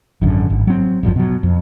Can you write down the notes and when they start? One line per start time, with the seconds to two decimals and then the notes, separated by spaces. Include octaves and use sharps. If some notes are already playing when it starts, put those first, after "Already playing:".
0.22 G#1 F#2 D3
0.50 G#1
0.67 F#3 C4
1.03 D#1 G#1 F#2 F3
1.16 B2 F#3
1.43 F2